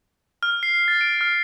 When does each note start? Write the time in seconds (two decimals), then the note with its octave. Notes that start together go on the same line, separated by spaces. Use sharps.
0.43 F6
0.63 C7
0.88 A6
1.01 D7
1.21 F6